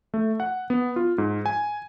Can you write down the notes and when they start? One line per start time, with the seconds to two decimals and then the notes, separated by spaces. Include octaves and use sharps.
0.14 A3
0.40 F#5
0.70 B3
0.96 F4
1.18 G#2
1.46 G#5